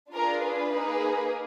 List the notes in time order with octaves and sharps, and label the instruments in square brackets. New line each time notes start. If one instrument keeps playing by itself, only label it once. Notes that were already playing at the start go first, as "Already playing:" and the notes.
[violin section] D4 F4 G#4 A#4
B4
A#3 D#4 G#4